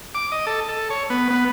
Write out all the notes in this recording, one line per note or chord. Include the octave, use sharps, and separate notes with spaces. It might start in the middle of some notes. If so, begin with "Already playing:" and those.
D6
D#5
A4
A4
C#5
B3
B3